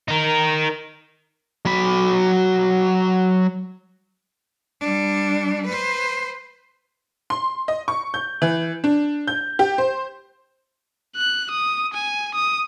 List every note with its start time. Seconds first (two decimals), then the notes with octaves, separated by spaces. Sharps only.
0.08 D#4 A#4
1.65 F#3 B5
4.81 G3 D4
5.66 B4 C5
7.30 C6
7.68 D#5
7.88 C#6
8.14 G6
8.42 E3
8.84 D4
9.28 G6
9.59 G4
9.78 C5
11.16 F#6
11.51 D#6
11.94 G#5
12.35 D#6